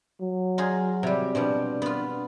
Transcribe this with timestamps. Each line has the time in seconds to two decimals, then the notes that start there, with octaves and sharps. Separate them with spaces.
0.21 F#3
0.58 D#4 F4 G#4
1.03 C3 G3
1.35 B2 F3 G3 D4
1.82 B3 F4